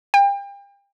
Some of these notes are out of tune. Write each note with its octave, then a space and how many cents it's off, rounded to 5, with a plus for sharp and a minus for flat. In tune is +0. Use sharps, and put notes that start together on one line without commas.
G5 +35